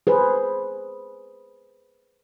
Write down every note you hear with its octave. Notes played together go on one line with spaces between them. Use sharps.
G#4 B4 C5